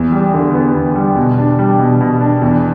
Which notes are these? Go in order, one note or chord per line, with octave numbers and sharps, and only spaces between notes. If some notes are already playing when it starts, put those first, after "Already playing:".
Already playing: E2
G3
D3
B3
E2
G3
B2
D4
G3
B2
B2
D4
E2